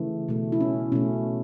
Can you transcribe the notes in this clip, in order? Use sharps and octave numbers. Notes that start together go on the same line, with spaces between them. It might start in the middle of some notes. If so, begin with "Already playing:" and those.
Already playing: C#3 E3 A3
B2 A3
E4
C#4
B2 A3 C#4